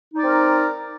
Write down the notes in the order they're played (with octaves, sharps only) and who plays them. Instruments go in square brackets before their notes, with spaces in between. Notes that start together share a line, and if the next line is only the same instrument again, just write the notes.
[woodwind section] D#4
D5
C4
A#4